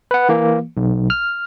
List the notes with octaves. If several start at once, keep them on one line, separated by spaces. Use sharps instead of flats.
B4 F#5
E3 A#3
B1
F6